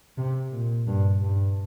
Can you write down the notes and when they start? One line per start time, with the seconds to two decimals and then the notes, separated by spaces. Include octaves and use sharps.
0.18 C3
0.52 A#2
0.87 G2
1.23 G2